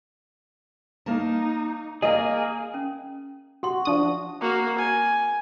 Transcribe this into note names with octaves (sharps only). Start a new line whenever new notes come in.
A#3 D#4 A#4 A5
A#3 G#4 D5 D#5
C#4
F#4 G4 F#5 C6
F3 D4 D#6
A#3 F#4
G#5